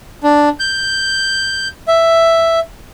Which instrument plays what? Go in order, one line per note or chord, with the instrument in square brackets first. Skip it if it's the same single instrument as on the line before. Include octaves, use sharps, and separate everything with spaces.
[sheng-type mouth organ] D4
G6
E5